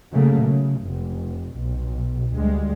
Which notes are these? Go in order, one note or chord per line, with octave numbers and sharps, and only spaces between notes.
C#3 F#3 A3 A#3
C#3
F1
B1
D2 G3 G#3